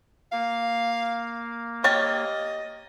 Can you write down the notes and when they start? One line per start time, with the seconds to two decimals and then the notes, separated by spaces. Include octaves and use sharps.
0.32 A#3 F5
1.84 G4 C#5 D#5 F6 A6